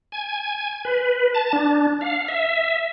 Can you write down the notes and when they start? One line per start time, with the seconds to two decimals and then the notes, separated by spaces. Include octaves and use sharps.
0.12 G#5
0.85 B4
1.34 A5
1.53 D4
2.01 F5
2.28 E5